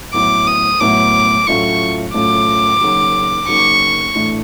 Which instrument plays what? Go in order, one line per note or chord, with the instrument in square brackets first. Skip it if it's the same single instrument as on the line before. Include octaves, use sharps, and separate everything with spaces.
[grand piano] A2 F#3 B3 E4 [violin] D6
[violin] D#6
[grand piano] A2 F#3 B3 E4 [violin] D6
[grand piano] A2 F#3 A3 C#4 F4 [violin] C#6
[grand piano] A2 F#3 A3 C#4 F4 [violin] D6
[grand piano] C#3 F#3 A#3 D#4 F#4
[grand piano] C#3 F#3 A#3 D#4 F#4 [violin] C#6
[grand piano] A2 E3 A3 D4